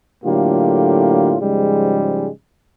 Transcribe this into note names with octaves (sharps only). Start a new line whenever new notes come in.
A2 D3 F#3 A#3 F4 G4
G#2 C#3 F3 G3 G#3